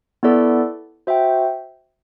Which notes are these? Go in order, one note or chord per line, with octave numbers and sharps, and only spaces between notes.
B3 E4 A4 D5
F#4 C5 E5 G5